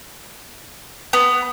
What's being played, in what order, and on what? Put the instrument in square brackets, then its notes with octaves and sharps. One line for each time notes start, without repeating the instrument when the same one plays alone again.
[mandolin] B3